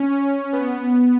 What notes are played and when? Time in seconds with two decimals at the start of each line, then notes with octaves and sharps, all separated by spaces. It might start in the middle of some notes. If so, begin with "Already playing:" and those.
Already playing: C#4
0.10 C#4
0.53 B3